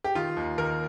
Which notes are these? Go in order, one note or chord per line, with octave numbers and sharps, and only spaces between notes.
G4
D#3 F4
D#2
D#2 A#4